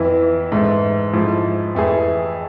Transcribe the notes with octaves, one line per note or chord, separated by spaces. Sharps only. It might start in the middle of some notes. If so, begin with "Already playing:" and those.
Already playing: F2 E3 B3 E4
G#2 E3 A3
G#2 F3 A3 E4
F2 E3 A3 E4 G#4